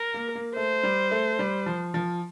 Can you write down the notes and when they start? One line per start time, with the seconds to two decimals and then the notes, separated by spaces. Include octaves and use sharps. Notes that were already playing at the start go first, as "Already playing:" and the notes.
Already playing: A#4
0.14 A#3
0.35 A#3
0.55 A3 C5
0.83 G3
1.11 A3
1.39 G3
1.66 F3
1.94 F3